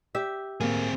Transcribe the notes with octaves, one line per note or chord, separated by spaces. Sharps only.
G4 E5
A#3 C4 G#4